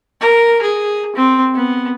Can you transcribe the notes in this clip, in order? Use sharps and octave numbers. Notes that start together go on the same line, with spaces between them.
A#4
G#4
C4
B3